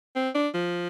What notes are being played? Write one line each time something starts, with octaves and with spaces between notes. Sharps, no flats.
C4
D4
F3